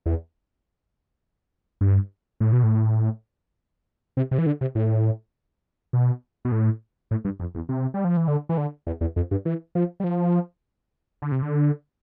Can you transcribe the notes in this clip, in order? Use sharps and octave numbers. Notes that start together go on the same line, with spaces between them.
E2
G2
A2
B2
A2
C3
C3
E3
D3
C3
A2
B2
B2
A2
A2
G2
F2
E2
C3
G3
F3
E3
D3
E3
D3
E2
E2
F2
G2
E3
F3
G3
F3
D3
C3
D3